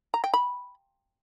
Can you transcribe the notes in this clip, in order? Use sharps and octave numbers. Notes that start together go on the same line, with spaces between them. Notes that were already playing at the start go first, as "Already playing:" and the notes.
A#5
G5
B5